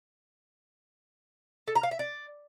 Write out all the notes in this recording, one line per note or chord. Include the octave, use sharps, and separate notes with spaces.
A4
A#5
F5
E5
D5